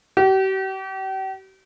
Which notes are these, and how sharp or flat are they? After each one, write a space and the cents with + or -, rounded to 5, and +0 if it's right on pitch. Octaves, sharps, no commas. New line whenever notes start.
G4 -40